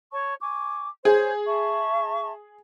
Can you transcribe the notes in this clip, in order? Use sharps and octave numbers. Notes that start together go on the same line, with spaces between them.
C#5 A5 C#6
G#5 C#6 D6
G#4 C5 C#5 G6
E5 A5 C#6